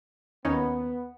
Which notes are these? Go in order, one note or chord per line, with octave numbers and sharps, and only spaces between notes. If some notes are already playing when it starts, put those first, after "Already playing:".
D#2 B3 C#4 D#4